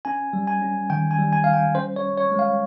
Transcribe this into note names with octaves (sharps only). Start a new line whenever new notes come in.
C#4 G#5
G3
G#5
C#4
D#3 G5
G#5
G3
G#5
G3 F5
G5
C#4 C5
C#5
C#4
C#5
G#3
F5